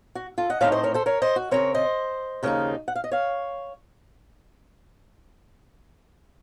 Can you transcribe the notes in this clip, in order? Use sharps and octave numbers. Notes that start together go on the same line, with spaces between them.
F#4
F4 A4
D#5 F#5
A2 A3 C4 D#4 C#5 F5
C5 D#5
A#4 C#5
A4 C5
A#4 C#5
C5 D#5
F#4
C#3 F3 C4 A#4 C#5
C5 D#5
D#2 C#3 F3 A#3 D#4
F#5
F5
D#5
C#5 F5